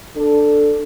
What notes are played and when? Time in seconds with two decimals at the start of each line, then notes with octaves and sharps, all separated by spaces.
0.16 D4 A4